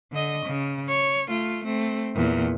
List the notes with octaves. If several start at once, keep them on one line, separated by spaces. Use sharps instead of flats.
D3 D#5
C#3
C#5
A3 F4
A3 C4
E2 A#2